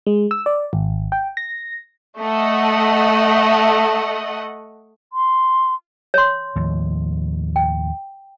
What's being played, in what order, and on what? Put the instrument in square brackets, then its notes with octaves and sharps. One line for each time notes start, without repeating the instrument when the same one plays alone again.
[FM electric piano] G#3
E6
D5
G#1
G5
A#6
[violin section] A3 D#5 F#5
[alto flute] C6
[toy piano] C#5 C6
[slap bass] D#2 A2 F3
[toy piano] G5